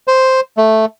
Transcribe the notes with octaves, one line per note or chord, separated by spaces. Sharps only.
C5
A3